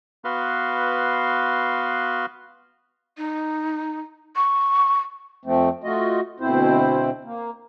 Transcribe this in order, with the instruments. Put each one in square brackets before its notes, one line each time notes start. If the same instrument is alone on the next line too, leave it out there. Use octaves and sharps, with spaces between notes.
[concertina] B3 F#4 B4 F5 C6
[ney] D#4
C#6
[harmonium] F2 F3 A3 C4
A3 F4 F#4 D#5
D2 B2 C4 E4 C5
A#3